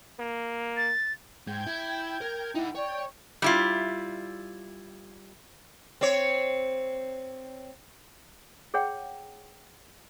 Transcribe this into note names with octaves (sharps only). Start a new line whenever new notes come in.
A#3
A6
G#2 G5 G6 G#6
E4
A#4
D#4 E4 F#5
C#5 D5 G5 C#6
G3 E4 F4
C4 C#5
G#4 C#5 F#5 G5